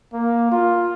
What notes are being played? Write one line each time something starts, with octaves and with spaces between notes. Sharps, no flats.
A#3
F4